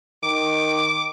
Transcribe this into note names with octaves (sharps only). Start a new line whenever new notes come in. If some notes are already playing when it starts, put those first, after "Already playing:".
D#3 D6